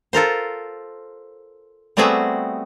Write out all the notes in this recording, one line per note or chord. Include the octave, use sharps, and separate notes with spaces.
F4 A4 A#4 C5
G3 A3 B3 C4 F#4 G#4